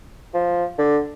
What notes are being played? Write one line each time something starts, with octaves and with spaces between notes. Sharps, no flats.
F3
D3